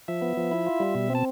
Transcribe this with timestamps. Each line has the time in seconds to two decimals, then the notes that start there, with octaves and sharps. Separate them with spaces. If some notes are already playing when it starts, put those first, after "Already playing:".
0.08 F3 E5
0.22 B3
0.37 F3
0.51 E4
0.66 F4
0.80 G3
0.95 B2
1.10 C4
1.15 A5